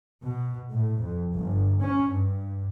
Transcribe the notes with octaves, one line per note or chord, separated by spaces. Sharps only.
B2
A2
F2
G1
C#4
G2